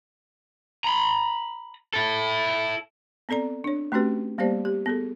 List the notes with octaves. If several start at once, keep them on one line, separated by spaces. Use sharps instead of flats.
A#5 B5
E4 A4
B3 C4 A4 D5 A#5
D4 C#5
A3 C4 C#4 F#4 G4 B4
G3 A#3 B3 G4 C5 D5
G4
B3 G#4 A4